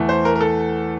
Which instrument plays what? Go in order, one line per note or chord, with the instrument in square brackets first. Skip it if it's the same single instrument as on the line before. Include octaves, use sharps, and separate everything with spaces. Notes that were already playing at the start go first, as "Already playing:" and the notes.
Already playing: [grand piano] E2 E3 A3
C5
A#4
A#4
A4